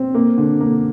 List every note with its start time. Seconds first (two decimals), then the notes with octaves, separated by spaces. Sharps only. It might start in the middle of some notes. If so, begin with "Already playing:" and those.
Already playing: C4
0.15 A#3
0.38 D3
0.60 A#3